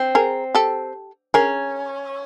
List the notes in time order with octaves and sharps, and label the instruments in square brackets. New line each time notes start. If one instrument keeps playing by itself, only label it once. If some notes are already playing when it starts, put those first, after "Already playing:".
Already playing: [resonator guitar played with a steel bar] C4
[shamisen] G#4 A#4
G4 A4
[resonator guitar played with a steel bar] C#4 [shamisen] G#4 A#4